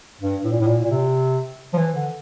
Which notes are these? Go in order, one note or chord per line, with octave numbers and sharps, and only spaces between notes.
G2
A2
A#2
A2
A#2
A#2
C3
F3
E3
D3